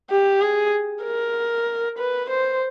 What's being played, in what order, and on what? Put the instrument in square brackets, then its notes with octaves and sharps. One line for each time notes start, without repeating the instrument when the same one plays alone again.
[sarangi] G4
G#4
A#4
B4
C5